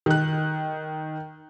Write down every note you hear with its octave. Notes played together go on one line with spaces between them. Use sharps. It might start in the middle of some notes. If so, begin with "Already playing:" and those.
D#3 F#6